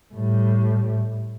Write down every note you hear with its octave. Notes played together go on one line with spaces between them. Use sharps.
A2 G3